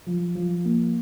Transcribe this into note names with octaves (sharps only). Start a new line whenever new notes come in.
F3
F3
A#3